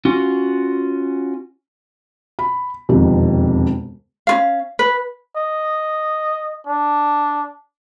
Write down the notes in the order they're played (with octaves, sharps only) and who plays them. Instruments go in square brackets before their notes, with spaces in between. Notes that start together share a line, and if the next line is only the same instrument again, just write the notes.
[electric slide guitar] C#4 F4 F#4
[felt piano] B5
E1 F2 C3 D#3
[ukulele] C#4 F4 F5
B4
[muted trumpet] D#5
D4